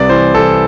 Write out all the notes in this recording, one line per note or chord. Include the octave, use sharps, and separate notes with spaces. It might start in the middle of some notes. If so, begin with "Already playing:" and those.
Already playing: C2 C3 B4 D5
E3 C5
E3 A4